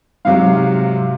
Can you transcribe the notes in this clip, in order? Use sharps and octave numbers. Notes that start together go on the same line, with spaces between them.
G#2 C3 F#3 F5